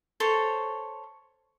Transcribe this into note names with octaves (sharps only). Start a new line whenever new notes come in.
A4 C5 C#5